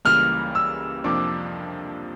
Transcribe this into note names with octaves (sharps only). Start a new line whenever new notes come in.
C#2 C#3 E3 G3 A#3 F6
E6
F2 C3 F3 A#3 D4 D6